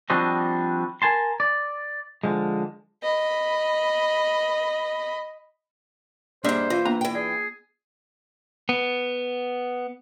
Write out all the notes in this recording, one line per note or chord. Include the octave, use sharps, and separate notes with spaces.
F3 G3 C4 D4 F#4 D#5
A#4 G#5 A5 C6
D5
D3 F3 G#3
D#5 B5
G#2 G3 A#3 D4 C5 D#5 E5
E3 F4 F5
A#3 B3 D4 A#5
E3 G5
G#4 D5
B3